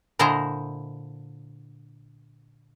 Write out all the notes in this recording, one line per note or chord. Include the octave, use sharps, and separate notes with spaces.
A#2 D3 E4 C5 D#5 A#5